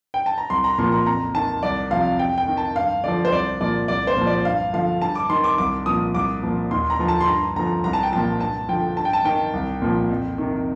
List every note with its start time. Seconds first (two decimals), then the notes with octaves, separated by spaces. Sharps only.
0.14 G5
0.26 A5
0.38 A#5
0.50 C2 C6
0.64 A#5
0.78 A#2 F3 C6
0.92 A#5
1.06 F2 A#5
1.35 D#3 A5
1.63 C2 D5
1.91 C3 F3 F5
2.19 F2 G5
2.38 G5
2.48 D#3
2.57 A5
2.76 G2 F5
3.04 D3 F3 D5
3.25 C5
3.32 C2 D5
3.61 A#2 F3 D5
3.88 C2 D5
4.07 C5
4.17 A#2 F3
4.27 D5
4.45 G2 F5
4.73 D3 F3 F5
5.02 G2 A5
5.15 D6
5.30 D#3 C6
5.44 D6
5.58 C2 D6
5.86 A#2 F3 D#6
6.14 C2 D6
6.43 A#2 F3
6.71 D#2 C6
6.90 A#5
6.99 D3 F3
7.08 A5
7.20 C6
7.28 G2 A#5
7.56 D3 F3 A#5
7.84 C2 A#5
7.93 A5
8.03 G5
8.12 A#2 F3 A5
8.40 G2 A5
8.69 D3 F3 G5
8.97 G2 A5
9.05 G5
9.13 A5
9.25 D#3 G5
9.53 C2
9.82 A#2 F3
10.10 F2
10.38 C3 D#3